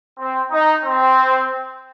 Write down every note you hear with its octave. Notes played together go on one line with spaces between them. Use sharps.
C4
D#4
C4